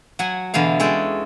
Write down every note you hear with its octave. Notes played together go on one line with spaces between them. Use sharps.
F#3 F#5 G#5
E2 B2 D3 E3 F5
G#3 C#4 A4 G5